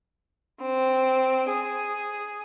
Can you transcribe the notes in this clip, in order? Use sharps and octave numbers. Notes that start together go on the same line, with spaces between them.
C4
G#4